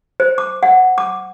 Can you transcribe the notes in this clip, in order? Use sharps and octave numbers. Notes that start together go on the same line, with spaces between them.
C5
D6
F#5
D6